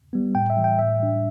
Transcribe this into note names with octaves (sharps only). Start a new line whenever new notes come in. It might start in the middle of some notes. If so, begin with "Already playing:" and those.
G3 B3
A2 G5
E5
E3 G3
G5
A2 E5
G3 D4